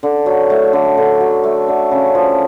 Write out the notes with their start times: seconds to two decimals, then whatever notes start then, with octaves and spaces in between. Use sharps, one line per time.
0.03 D3
0.26 F#3
0.50 A3
0.73 D3
0.97 D3
1.20 F#3
1.44 A3
1.68 D3
1.91 C#3
2.15 F3